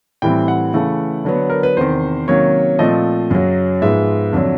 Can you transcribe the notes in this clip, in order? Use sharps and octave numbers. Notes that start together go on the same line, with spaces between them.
A2 E3 G3 C4 G5
F#5
C#3 E3 A3
D3 F#3 B3
A#4
B4
E2 C3 D#3 C5
C3 D#3 F#3 A#3 C#4 C#5
A#2 F3 A3 C4 D#5
F#2 C#3 F#3
G#2 F3 G#3 B3 E5
F2 D3 F#3